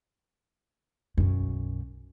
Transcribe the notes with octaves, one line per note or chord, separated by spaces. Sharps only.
B1 F#2